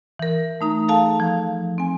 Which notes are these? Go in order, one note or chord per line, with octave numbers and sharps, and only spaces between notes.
E3 A#4
A3 D#4 A#5
G#4 A4 F5 A5
F3
C4 G#5